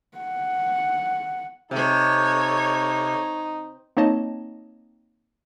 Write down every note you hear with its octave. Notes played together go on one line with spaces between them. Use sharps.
F#5
C3 D#4 A4 C#5
A#3 C4 D#4 C#5 D#5 A5